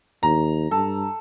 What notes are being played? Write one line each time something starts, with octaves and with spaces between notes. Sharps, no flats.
D#2 A#5
G2 A4